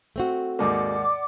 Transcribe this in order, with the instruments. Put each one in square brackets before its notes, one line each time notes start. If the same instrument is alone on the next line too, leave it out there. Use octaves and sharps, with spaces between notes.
[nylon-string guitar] A3 C4 F#4
[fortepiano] D#2 G#2 A#3 [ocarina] D5 [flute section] F#5 D6